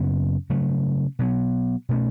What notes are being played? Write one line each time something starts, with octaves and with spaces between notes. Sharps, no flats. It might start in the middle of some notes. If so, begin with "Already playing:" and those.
Already playing: F#2 C#3 F#3 B3
C#3 F#3 A3
B2 F#3 B3
B2 A3 C#4